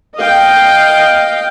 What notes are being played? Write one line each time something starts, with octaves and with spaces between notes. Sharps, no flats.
D#5 F5 G5